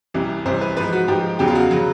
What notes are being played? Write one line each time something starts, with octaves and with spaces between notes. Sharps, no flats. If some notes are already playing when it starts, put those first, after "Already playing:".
C2 C3 E3 G3
C2 C3 E3 G3 C5
B4
G#2 F3 B4
F#4
G#2 F3 G4
E2 C#3 F#3 G4
F4
F#4
C#3 F#3